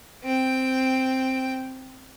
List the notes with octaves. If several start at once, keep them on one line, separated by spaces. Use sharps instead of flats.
C4 G5